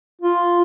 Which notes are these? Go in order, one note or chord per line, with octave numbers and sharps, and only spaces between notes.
F4